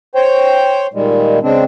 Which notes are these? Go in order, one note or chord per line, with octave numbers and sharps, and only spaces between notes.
C5 C#5 G5
A#2 D#3 G3 G#3
C#3 G#3 C4 D4